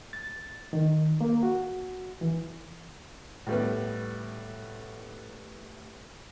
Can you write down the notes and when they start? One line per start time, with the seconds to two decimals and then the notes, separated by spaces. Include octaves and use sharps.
0.13 A6
0.73 D#3
1.21 A#3
1.43 F#4
2.21 E3
3.46 A2 G3 B3